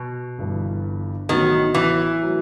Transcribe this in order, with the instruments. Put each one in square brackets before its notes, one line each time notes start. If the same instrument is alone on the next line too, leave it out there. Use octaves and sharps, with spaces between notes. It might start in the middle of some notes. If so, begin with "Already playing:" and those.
Already playing: [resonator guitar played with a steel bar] B2
[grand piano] G1 G2 E3
[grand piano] A1 A2 F#3 B3 F#4 [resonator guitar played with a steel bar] D#3
[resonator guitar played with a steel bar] E3
[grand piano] F#3 A3